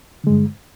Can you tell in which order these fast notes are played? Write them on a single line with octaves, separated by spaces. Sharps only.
D3 G#3 G2